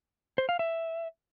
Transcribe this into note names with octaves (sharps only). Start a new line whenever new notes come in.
C5
F5
E5